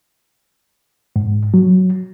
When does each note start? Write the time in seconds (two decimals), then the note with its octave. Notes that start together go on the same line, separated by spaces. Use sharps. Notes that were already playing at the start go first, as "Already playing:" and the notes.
1.16 G#2
1.54 F#3